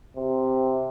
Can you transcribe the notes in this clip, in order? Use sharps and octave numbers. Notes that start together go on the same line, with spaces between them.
C3